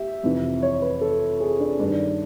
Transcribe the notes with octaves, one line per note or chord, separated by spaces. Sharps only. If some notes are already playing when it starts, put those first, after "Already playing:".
Already playing: G4 E5
F2 C3 E3
C#5
B4
A4
G#4
D4
G2 D#3 D4